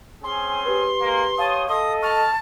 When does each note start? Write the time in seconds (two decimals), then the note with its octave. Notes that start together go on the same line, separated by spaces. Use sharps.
0.24 C4 C#4 G#4 C6
0.65 G4 B4
1.01 G#3 A#3
1.38 G4 C#5 F5 A5 D#6
1.69 A4 D#5 D#6
2.02 A5 C#6 F6